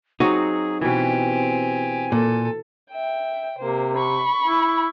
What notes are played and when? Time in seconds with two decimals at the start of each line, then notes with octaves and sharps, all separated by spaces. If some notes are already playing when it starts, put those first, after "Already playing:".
0.20 F#3 C4 D#4 F#4 G#4
0.81 B2 E3 C4 G4 G#5
2.12 A#2 A4
2.91 E5 G5
3.58 C3 A#3 C5
3.97 B5 C#6
4.46 E4